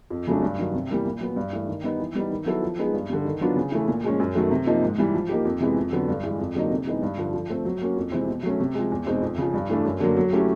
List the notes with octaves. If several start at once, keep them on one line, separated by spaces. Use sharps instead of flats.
F2
C#3 F#3 A3 D4
G2
D#3 F#3
C3
E3 G3 A#3
A#2
F#3 B3
G2
E3 A3
D#3
G3 B3 D#4
E3
G3 B3 D#4
D#3
F#3 B3 E4 A4
F3
G#3 B3 D#4 G#4
G2
D3 G3
D#3
F#3 B3 D4 F4
C#3
E3 A3
A#2
F3 G#3 C#4
F#2
D#3 F#3 A3
C3
F3 A#3 D#4
G#2
E3 G3
F3
A#3 D#4 G4
F2
C3 E3 G#3 B3
F2
D3 F#3 B3
G2
E3 G#3
F2
D3 F#3 A#3 D#4
C3
E3 G#3 B3 D#4
G2
D3 F3
F3
A3 C4
F#3
A#3 C#4 F#4
F2
C3 E3 G#3 C4
B2
F#3 A3 C#4
C3
F3 G#3
E2
B2 G#3 C4 D#4
F2
C#3 F3
G2
E3 A3 D4
F#2
D3 F#3 A#3
F#3
A3 C#4 E4 G4